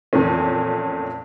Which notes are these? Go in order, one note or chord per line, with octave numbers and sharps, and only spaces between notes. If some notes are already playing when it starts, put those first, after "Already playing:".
F2 A#2 E3 A3 C#4